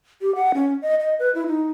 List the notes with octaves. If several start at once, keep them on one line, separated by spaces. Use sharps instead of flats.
G4
F#5
C#4
D#5
D#5
B4
E4
D#4